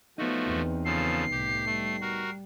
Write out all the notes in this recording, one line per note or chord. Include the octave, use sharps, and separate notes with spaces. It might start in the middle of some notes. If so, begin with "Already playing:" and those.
F3 A3 B3 D#4 F#4
E2 C4
C#3 F3 A4 C7
C2 A2 G4
G3 A3
F#4 A#4